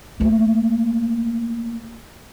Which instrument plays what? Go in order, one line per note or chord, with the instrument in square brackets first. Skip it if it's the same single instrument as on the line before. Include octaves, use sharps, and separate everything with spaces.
[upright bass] A3 A#3